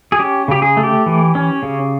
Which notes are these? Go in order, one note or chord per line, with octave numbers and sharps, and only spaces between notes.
G#4
C#4 G4
C#3 G4
G#4
A3
G4
E3
C#4
C#3